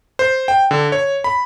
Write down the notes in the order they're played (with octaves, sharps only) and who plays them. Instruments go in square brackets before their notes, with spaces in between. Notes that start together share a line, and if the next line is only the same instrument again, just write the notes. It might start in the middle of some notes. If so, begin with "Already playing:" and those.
[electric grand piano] C5
G5
D3
C#5
B5